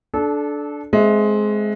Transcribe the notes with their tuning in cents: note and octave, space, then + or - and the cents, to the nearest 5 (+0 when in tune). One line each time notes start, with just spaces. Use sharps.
D4 +0 A4 -25
G#3 +15 C4 +0 E5 +5